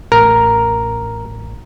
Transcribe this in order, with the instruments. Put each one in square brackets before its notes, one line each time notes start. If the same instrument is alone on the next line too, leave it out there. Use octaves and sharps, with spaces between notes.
[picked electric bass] A1 A2 [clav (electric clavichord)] A#4